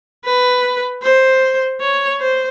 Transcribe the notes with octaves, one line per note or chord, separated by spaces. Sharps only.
B4
C5
C#5
C5